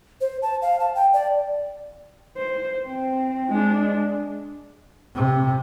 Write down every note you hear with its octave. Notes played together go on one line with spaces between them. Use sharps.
C5
A5
F5
A5
G5
D5
C5
C4
G#3 D4
C3